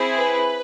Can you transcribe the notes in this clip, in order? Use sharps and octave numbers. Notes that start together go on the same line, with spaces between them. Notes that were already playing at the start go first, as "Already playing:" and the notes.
Already playing: C4 E4 G#4
B4